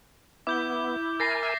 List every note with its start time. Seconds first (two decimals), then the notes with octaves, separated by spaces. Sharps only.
0.47 B3 E4 D6 G6 G7
1.20 A#4 G#5 A6 A#6 C7
1.43 E5